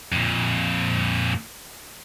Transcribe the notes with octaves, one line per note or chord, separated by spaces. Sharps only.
F2 A#2